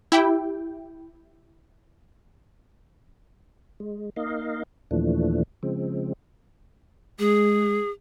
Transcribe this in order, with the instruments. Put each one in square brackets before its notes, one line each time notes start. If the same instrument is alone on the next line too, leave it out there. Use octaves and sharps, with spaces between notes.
[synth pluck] E4 G4 G5
[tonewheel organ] G#3
A#3 D#4 D#5 F5
D#2 A#2 E3 F3 A3 D4
C#3 F3 G#3 C4
[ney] G#3 [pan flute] G#4